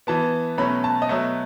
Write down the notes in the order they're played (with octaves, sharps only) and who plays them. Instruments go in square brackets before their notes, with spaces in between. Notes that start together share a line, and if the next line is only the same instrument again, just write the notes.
[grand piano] E3 B3 A5
B2 F#3 A3 C#4 B5
A5
D#5
B2 F#3 A3 E5